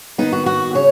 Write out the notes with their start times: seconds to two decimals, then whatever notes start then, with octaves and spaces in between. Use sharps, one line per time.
0.18 D#3 B3 D#4
0.32 F#4
0.46 F#4
0.75 C#3 C#5